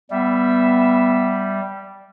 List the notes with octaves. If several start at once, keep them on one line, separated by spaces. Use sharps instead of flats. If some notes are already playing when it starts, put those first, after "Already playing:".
G3 B3 E5